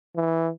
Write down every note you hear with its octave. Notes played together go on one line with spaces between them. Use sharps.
E3